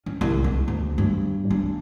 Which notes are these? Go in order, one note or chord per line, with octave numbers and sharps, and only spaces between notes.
C#4
C2
C#2
D2
G2
D4